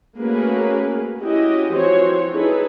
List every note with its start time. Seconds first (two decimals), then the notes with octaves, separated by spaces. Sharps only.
0.19 A3 A#3 C#4 F#4 G#4 B4
1.21 C#4 E4 F#4 G4 D#5
1.74 E3 F3 C4 F#4 C5 C#5
2.32 D#4 E4 G#4 A4 B4